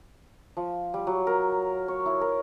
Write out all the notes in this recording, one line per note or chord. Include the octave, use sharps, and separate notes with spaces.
F3
G3
F#3
A#4
C#5
E4
A#4